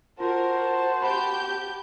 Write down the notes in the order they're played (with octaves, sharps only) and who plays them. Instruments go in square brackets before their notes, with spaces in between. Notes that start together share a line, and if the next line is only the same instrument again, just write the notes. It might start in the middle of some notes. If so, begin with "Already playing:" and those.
[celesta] F4 [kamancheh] F#4 A5 [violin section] A#4 [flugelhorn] C5
[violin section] G4 G6 [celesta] B5